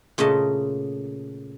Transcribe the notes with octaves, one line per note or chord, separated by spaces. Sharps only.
A#2 C#3 A3 D#5 A5